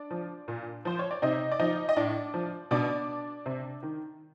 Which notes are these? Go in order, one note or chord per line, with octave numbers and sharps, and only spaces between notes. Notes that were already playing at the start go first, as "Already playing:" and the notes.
Already playing: D4 D5
F3
A#2
F3 C5
C#5
D5
C3 D#4 D#5
D5
F3 D#4 D#5
D#5
A2 D4 D5
F3
B2 D4 D5
C3
D#3